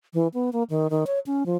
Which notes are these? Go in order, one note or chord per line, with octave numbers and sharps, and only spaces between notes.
E3
B3
A#3
D#3
D#3
C#5
C#4
F3